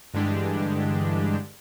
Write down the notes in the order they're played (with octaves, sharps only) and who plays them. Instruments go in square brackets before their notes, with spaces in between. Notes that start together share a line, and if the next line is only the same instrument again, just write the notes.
[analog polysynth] G2 D3 E3 G#3 D4 G4